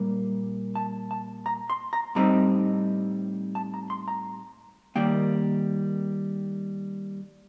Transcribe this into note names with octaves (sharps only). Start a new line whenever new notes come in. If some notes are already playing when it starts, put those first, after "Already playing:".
Already playing: A#2 G3 A#3
A5
A5
A#5
C6
A#5
A2 G3 C4 D#4 A#5
A5
A#5
C6
A#5
D#3 G3 A#3 G5